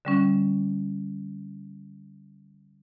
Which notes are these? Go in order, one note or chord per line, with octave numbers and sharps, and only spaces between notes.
D3 G3 C#4